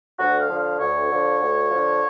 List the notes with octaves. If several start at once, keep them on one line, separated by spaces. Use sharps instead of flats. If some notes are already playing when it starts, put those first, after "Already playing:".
D2 F#4
F5
D3 F3
F5
D2 C#5
D3 F3
D2
D3 F3